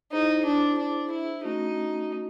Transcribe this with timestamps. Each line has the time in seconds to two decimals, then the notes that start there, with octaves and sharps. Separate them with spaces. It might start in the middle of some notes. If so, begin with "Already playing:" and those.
0.12 D#4 E4 G#4 C5
0.45 D4
0.78 D4
1.10 E4
1.43 A3 C#4 D#4 F#4